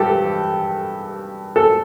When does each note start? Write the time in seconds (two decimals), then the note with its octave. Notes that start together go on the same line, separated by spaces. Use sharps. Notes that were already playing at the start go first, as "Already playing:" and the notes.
Already playing: G2 G4 A4
1.56 A4